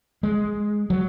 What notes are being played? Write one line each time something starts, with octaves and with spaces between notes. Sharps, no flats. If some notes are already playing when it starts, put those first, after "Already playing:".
G#3
F#3